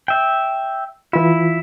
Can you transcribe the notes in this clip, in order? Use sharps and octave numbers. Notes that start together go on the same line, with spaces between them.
E5 G5
E3 E4 F4